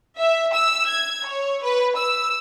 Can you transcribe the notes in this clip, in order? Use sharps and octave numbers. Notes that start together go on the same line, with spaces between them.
E5
E6
G#6
C#5
B4
E6